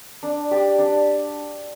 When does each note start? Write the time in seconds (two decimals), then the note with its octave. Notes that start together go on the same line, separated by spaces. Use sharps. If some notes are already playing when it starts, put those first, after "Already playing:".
0.23 D4
0.51 G4 D5
0.79 D4